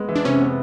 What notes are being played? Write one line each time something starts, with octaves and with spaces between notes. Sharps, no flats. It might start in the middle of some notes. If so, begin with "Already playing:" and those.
Already playing: G#3 B3
E3
D4
C3 C#4
B3